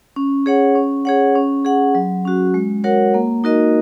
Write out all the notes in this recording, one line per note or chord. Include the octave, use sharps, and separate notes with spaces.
C#4
G#4 C#5 F#5
C#4
G#4 C#5 F#5
C#4
G#4 F#5
F#3
C#4 F#4
G#3
F#4 A#4 C#5 F#5
A#3
D#4 F#4 A#4 D#5